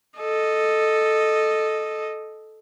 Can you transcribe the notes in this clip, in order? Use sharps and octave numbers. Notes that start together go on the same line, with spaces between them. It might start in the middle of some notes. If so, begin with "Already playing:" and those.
A4 D#5